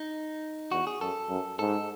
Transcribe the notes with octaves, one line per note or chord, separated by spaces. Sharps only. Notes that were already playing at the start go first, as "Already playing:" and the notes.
Already playing: D#4
E2 F#4
G#4
F#2 A4
F#2
G#2 A4